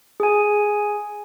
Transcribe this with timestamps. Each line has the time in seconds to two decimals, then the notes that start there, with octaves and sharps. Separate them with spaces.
0.20 G#4 G#5